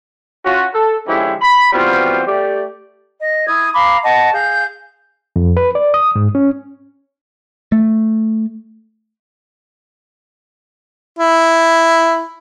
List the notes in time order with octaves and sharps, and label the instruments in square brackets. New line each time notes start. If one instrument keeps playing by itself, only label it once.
[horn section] C#4 F4 F#4
A4
D3 F3 G#3 C#4 E4 G4
B5
E3 G3 B3 C4 F4 F#4
A3 G4 D5
[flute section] D#5
E4 D#6 G#6
F5 A#5 B5 D6
D#5 F#5 A5 C#6
G#4 F5 G6
[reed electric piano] F2
B4
D5
D#6
G#2
C#4
[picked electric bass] A3
[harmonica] E4